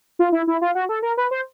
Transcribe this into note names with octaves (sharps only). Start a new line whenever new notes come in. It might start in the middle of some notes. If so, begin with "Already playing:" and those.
F4
E4
E4
F4
F#4
A4
A#4
B4
C5